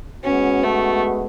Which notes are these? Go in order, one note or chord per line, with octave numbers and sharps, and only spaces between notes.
G#3 B3 C#4 F#4
A3